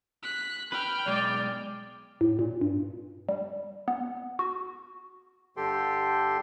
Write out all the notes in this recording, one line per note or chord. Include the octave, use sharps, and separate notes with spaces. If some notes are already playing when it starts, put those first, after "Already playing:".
F#6 B6
B4 G5 F6
B1 G#3 D5
A2
A#2
G2
G3
B3
F#4
G2 D3 G4 A4 G5 C6